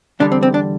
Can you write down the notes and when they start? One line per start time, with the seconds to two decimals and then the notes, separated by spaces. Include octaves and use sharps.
0.20 E2 D3 G3 D4
0.32 C4
0.43 C4
0.54 D4